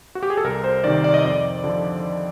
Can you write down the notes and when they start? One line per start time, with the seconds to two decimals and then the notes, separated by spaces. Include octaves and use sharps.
0.15 F#4
0.23 G4
0.30 G#4
0.37 A4
0.44 C2 A#4
0.64 C5
0.84 C3 D#3 D5
1.04 D5
1.14 D#5
1.24 F2 D5
1.64 D3 F3